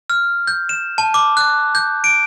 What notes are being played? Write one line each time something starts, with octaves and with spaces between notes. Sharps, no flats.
F6
G6
E7
A5
D6
F#6
G6
D7